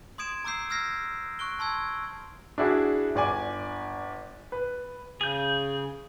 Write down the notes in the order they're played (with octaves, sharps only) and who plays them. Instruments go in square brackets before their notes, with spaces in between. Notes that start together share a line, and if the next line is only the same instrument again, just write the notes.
[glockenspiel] C6 D#6 G#6 D7 E7
A#5 D6 E6 G6 C7
E6 F6 G#6 A#6 C7
C#6 F#6 D7 G7
A5 C6 E6 G#6
[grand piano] D4 E4 F#4 G#4
G1 D5 G#5
B4
[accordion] C#3 [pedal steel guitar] G#4 G6